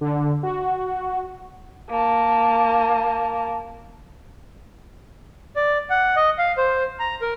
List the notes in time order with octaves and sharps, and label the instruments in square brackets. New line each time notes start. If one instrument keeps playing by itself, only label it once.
[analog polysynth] D3
F#4
[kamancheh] A#3 A5
[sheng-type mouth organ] D5
F#5
D#5
F5
C5
A#5
A#4